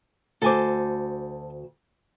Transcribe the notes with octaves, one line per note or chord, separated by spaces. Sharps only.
D2 A4 C5 G#5 D6